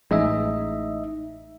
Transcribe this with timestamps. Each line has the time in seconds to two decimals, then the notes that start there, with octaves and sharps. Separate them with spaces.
0.11 A1 E3 G#3 D#4 D#5 E5